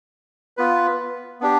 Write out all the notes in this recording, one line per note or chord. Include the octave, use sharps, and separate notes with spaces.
B3 F4 B4
B3 D4 G4